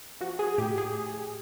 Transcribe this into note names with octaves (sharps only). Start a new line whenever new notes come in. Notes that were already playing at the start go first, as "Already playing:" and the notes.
F3 F#4
G#4
A2 G4
G#4